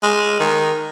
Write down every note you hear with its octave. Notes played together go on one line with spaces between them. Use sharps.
G#3
D#3